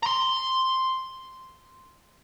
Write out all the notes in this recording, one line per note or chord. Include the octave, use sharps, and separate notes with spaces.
A#5 C6